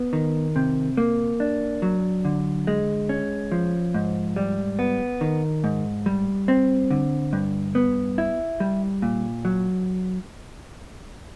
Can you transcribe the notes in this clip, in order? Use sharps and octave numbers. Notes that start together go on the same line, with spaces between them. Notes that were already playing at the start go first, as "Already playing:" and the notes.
Already playing: B3
D#3
C3
A#3
D4
F#3
D3
G#3
C#4
F3
G#2
G3
B3
D#3
G#2
G3
C4
D3
G2
B3
E4
G3
A#2
F#3